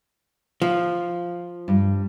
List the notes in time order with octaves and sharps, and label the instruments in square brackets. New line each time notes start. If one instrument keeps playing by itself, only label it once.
[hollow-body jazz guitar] F3
[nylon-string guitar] G2